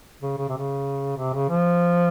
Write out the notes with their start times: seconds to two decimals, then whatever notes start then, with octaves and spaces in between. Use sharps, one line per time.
0.22 C#3
0.37 C#3
0.48 C3
0.58 C#3
1.17 C3
1.33 C#3
1.49 F3